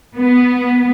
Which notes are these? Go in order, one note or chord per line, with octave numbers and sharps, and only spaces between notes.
B3